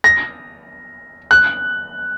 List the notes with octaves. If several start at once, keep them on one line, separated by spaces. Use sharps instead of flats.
A#6
F#6